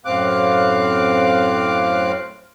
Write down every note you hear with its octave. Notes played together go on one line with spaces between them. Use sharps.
F#2 A2 C4 F5 D6 F#6